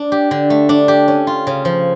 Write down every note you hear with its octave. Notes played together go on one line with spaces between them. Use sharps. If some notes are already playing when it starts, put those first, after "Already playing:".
Already playing: D4
G4
D3
A3
D4
G4
C#4
F4
C#3
F3